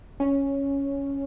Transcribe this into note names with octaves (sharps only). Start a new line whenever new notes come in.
C#4